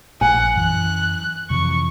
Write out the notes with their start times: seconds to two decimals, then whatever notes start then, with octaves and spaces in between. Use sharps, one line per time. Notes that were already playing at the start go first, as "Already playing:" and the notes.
0.21 A#1 F#5 G#5
0.55 F#2 E3 F#6
1.50 F2 C3 E3 C#6